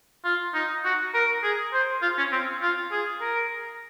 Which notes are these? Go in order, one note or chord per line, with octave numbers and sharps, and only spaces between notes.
F4
D#4
F#4
A#4
G#4
C5
F4
C#4
C4
F4
G#4
A#4